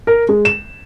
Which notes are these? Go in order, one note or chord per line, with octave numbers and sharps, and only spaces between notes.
A#4
G#3
E7